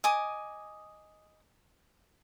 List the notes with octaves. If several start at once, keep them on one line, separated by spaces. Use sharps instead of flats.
D#5 G#5 D6 D#6